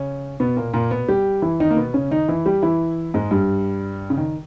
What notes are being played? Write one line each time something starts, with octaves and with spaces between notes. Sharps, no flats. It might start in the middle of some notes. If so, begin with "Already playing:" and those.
Already playing: C#3 C#4
B2 B3
A#2 A#3
A#2 A#3
B2 B3
G3 G4
E3 E4
D#3 D#4
A#3
B2 B3
C#3 C#4
D#3 D#4
E3 E4
G3 G4
E3 E4
G#2 G#3
G2 G3
C#3
D#3